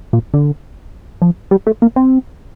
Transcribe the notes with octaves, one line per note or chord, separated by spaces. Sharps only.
A#2
D3
F3
G3
A3
A#3
C4